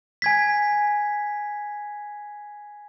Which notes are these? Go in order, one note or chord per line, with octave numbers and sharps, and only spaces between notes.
G#5 G#6 B6